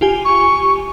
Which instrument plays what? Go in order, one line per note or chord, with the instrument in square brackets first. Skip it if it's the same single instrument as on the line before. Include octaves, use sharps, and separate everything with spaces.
[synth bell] F4 G4 G#5
[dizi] C#6